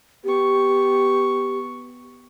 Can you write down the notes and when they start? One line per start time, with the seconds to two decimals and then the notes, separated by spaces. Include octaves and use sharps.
0.24 B3 G4 C#6